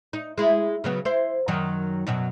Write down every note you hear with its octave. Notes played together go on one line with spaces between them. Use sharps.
D#4
G#3 E4
C#3 F#3 B3
E4 C5
F#2 D#3 F#3
F#2 B2 F#3